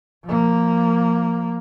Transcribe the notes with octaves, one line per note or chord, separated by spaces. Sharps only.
F3 A#3